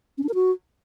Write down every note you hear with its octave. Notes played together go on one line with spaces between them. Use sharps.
C#4
D4
A#4
F#4